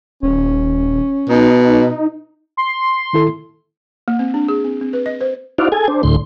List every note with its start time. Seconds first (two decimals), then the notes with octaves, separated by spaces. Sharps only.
0.23 D#1 C#4
1.29 B2 D#4
2.57 C6
3.13 D#3 E4 A4
4.08 A#3
4.19 C4
4.34 D4
4.48 G#4
4.65 C4
4.81 C4
4.93 B4
5.06 D#5
5.21 C5
5.58 D#4 E4 F#4 C5 D5 F5
5.72 G#4 A4 G#5
5.88 D4 C5
6.03 D2 A2 D3 C6